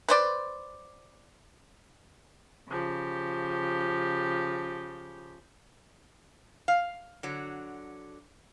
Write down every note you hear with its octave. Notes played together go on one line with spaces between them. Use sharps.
B4 C5 D5
C#3 F3 G4
F5
D3 F#3